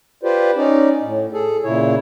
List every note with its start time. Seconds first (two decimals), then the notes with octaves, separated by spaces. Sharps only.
0.23 F4 G4 B4 C5 D5
0.56 C#4 D#4 D5
1.02 A2
1.33 G#4 A4
1.64 A#2 C#3 E4 C#5